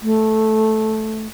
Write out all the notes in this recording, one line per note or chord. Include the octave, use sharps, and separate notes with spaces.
A3